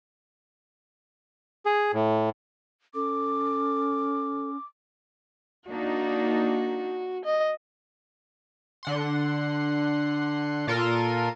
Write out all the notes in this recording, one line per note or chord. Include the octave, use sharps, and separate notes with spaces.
G#4
A2
C#4 A4 D6
A#3 D4 D#4 F#4
D#5
D3 F#5 C6
A#2 F4 A4 A#4 C6 D#7